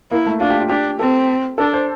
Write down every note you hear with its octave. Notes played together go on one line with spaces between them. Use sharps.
A#3 E4
A3
D4 F4
G4
F4
D4 G4
C4 A4
D4 A4
C5